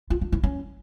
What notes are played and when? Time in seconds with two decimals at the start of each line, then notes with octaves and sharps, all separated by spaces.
0.10 F4
0.21 D4
0.32 E4
0.43 C#4